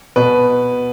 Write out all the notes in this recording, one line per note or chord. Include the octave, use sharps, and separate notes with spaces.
B2 B4